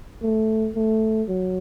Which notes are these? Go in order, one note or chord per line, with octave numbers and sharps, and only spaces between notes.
A3
A3
F#3